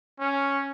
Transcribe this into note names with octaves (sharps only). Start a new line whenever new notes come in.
C#4